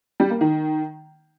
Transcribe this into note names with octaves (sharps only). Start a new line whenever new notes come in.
G3
A#3
D#3